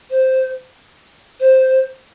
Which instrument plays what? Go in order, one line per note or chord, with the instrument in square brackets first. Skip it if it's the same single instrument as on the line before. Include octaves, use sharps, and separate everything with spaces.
[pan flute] C5
C5